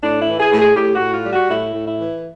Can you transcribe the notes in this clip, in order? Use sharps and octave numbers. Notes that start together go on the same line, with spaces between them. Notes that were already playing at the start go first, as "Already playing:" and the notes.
A2 D4
E4
E3
G#4
A2
G#4
A2 G4
F#4
A2
F4
G3
F#4
A2 E4
A2
E4
E3